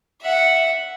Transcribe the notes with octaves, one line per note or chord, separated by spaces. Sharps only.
E5 F#5